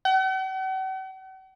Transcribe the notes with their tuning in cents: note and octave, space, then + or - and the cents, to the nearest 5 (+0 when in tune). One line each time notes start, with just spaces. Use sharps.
F#5 +45